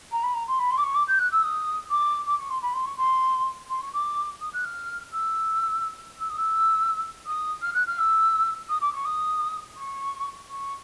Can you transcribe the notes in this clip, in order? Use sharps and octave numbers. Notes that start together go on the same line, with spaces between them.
A#5
B5
A#5
C6
B5
C6
D6
C#6
D6
G6
F#6
E6
D#6
D6
D6
C#6
C6
B5
C6
C#6
C6
C6
C#6
D6
D#6
F#6
F6
E6
E6
D#6
E6
D#6
F6
F#6
F6
E6
D#6
D6
C#6
D#6
C#6
C#6